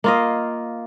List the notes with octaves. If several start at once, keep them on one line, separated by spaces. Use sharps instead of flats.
A#3 F4 D#5